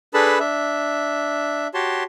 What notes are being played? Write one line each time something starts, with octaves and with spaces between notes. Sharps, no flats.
D4 G#4 A4 B4 A5 B5
D4 E5
F#4 G4 C#5 A5 C6